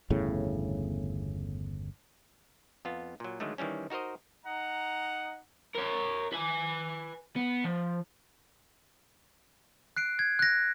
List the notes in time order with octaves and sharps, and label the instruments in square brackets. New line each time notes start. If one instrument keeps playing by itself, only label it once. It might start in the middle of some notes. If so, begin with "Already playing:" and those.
[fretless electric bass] G1 E2 A2 C#3
[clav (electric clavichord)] F2 B3 F4
A#2 F#3
D3 D#3 F#3 G#3 A3
D#3 E3 G3 C#4
D#4 F#4 A#4 C5 D#5
[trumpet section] D#4 D#5 F#5 A#5
[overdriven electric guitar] A#4 C#5
B4 G#5
B3
F3
[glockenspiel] F#6 C7 D7
G#6
F#6 A#6